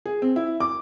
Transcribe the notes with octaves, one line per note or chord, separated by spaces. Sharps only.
G#4
C4
E4
D6